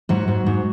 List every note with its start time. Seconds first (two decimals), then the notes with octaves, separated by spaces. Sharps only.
0.09 G#2 F#3 F#4
0.28 G#2
0.46 G#2